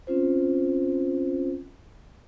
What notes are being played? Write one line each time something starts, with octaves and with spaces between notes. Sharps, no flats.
C4 C#4 F4 C5